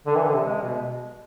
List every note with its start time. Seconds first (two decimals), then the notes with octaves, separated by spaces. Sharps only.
0.07 D3
0.16 E3
0.25 D3
0.34 C3
0.44 G#3
0.62 B2